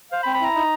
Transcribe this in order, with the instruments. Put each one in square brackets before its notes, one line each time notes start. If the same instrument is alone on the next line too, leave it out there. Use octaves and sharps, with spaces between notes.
[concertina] C5 [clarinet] F5
[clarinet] B5
[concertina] C4
[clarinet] B5
[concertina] E4 [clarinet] A#5
[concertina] D#4